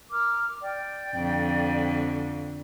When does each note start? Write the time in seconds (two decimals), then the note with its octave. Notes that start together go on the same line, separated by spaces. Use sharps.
0.10 A#4 D6 F6
0.62 D5 G5
1.16 F2 D3